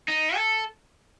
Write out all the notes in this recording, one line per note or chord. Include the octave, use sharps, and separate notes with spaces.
D#4
A4